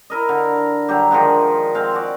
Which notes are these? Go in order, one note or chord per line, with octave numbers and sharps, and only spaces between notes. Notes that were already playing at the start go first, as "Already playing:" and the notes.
E4 A#4 D#5
D3
D3 F#3 G3 G4
D#3 F3 G#3 D4
G#3 C4 F5
F#4 D5